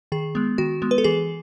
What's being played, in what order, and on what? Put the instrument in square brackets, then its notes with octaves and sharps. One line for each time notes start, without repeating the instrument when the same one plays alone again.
[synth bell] D#3 G#4
G#3 B3
D#3 F#4
G#3 B3
B4
A4
E3 G#4